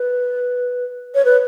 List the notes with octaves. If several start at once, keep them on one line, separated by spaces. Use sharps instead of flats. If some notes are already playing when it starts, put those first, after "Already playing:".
Already playing: B4
C#5
B4